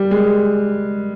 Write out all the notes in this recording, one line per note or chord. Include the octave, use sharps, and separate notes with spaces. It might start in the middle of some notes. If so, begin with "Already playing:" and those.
Already playing: G3
G#3